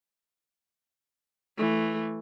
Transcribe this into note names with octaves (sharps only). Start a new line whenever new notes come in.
E3 A3